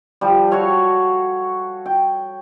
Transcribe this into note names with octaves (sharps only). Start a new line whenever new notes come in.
F3 G3
F#4 A4 C#5 F5
G5